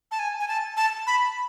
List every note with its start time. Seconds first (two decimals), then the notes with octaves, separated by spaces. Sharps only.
0.11 A5
0.19 G#5
0.40 G#5
0.48 A5
0.77 A5
1.07 B5